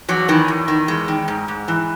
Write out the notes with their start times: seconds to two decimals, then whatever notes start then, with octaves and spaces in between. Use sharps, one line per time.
0.08 E2 F#3
0.28 D#3 E3
0.48 E2
0.68 D#3
0.88 E2 G#3
1.08 D#3
1.28 G#2
1.48 G#2
1.68 E3